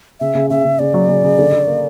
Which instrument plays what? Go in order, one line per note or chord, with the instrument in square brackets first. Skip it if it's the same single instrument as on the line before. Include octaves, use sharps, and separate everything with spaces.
[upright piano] C#3 [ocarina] E5
[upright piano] C#3
[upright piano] C#3 [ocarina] E5
[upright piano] C#3
[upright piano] C#3 [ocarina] D5
[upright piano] F#3
C#3
C#3
D3
D3
A#3